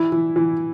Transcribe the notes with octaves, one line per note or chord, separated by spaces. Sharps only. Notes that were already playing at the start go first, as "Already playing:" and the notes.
Already playing: E3 E4
E3
E3